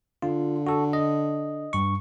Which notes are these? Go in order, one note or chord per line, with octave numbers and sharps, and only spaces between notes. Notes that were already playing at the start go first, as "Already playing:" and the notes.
D3 F4
F#4 A4
D#5
G2 C#6